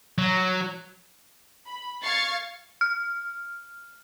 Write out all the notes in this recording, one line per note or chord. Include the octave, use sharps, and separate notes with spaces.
F#3
B5
F5 C#6 G#6 A6 C7
F6